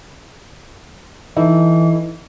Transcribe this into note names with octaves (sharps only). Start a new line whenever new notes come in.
E3 D#4 E4 A4